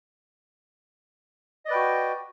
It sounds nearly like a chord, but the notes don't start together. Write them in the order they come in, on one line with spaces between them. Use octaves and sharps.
D#5 D5 B4 G5 F#4